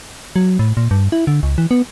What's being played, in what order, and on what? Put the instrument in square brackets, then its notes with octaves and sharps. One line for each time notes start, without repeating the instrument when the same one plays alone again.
[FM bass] F#3
A2
A#2
G2
E4
D3
C#2
E3
B3